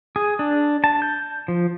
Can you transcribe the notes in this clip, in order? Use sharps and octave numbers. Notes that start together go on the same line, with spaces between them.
G#4
D4
A5
G6
F3